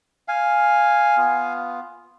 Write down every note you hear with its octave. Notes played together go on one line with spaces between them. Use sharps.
F5 G#5
B3 F4